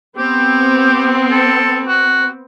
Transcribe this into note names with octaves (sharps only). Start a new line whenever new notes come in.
B3 C4 G4
A4
F#4